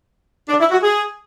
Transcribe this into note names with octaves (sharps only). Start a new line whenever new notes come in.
D4
E4
F#4
G#4